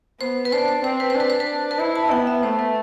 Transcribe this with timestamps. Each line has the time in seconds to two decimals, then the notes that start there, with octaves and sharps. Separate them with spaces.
0.20 B3 C5
0.45 B4
0.52 D4 C5
0.68 C5
0.84 C4 C5
1.00 B4
1.10 C5
1.15 D4 B4
1.30 C5
1.40 B4
1.71 B4
1.79 E4 C5
1.96 A5
2.11 B3 G5
2.27 E5
2.43 A3 C5
2.59 B4